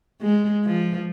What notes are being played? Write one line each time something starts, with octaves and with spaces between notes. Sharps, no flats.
G#3
F3